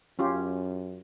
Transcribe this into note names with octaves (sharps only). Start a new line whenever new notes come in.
F#2 C#4 F4 G4